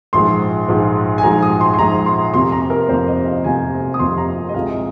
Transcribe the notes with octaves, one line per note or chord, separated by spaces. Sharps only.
A#1 G#2 F3 G#3 C6
A#1 G#2 F3 G#3
G#5
A#1 G#2 F3 G#3 A#5
D#6
C6
C6
A#1 G#2 F3 G#3 A#5
C6
F1 F2 C3 F3 A#3 C6
A#5
A#4
F1 F2 C3 F3 A#3 C5
D#5
F5
F1 F2 C3 F3 A#3 G#5
D#6
F1 F2 C3 F3 A#3 C6
A#5
D#5
C2 A#2 F3 G#3 F5